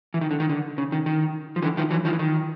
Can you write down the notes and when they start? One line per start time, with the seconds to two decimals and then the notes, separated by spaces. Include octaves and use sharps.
0.14 E3
0.21 D#3
0.31 D3
0.40 D#3
0.49 D3
0.78 C#3
0.92 D#3
1.06 D#3
1.56 F3
1.62 D3 E3
1.77 D#3 F3
1.91 E3 F#3
2.05 D#3 F3
2.13 E3
2.19 D#3